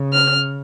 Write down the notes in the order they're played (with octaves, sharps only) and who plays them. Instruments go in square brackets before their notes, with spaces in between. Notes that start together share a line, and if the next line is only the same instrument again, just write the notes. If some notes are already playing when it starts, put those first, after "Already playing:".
Already playing: [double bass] C#3
[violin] F6